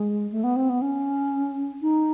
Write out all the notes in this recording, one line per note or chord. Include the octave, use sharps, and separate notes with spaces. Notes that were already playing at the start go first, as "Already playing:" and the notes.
Already playing: G#3
A3
B3
C4
B3
C#4
D#4